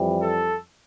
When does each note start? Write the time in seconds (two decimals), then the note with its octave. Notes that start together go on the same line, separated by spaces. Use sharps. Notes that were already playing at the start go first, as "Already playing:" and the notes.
Already playing: F2 E3 G3
0.21 A4